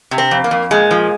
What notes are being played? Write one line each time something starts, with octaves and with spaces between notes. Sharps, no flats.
C3
C4
F2
A#3
F2
A#2 G#3
F3